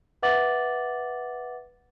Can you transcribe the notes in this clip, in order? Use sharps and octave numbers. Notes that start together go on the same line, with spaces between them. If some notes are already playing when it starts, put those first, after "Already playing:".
B4 E5 F#5 D6 A6 F#7